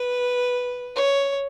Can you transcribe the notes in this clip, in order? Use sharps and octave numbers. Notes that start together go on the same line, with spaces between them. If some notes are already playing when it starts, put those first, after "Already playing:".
Already playing: B4
C#5